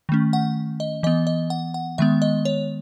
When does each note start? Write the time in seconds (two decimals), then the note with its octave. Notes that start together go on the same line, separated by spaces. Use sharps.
0.09 D#3 A3 C#4
0.33 F#5
0.80 D#5
1.03 E3 B3 D#5
1.27 D#5
1.50 F#5
1.74 F#5
1.98 D#3 G#3 B3 E5
2.22 D#5
2.45 C#5